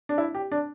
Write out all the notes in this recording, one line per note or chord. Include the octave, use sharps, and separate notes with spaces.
D4
E4
G4
D4